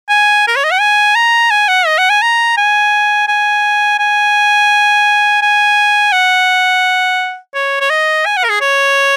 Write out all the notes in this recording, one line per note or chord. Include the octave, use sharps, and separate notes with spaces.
G#5
A#4
C#5
D#5
F#5
G#5
A#5
G#5
F#5
D#5
F#5
G#5
A#5
G#5
G#5
G#5
G#5
F#5
C#5
C#5
D#5
G#5
F#5
A#4
G#4
C#5